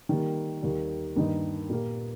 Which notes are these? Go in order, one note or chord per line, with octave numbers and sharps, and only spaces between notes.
D#3 G3 A#3
D#2 D#3 G3
G2 D#3 A#3 D#4
A#2 A#3 G4